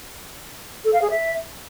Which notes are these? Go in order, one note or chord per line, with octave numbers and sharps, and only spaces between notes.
A4
F5
G#4
E5